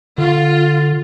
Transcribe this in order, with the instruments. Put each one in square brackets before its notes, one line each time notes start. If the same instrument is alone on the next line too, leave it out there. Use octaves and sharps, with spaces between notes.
[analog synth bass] D3 [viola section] F4